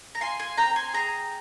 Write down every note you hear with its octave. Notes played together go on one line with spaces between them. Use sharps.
A#5
F4 G#5 C6
G#5 C6
C4 G5 A#5
G#5 C6
G#4 G5 A#5